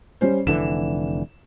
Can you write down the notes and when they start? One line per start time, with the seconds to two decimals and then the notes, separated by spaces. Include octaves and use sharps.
0.21 G3 C#4 C5
0.47 F1 D3 E3 E7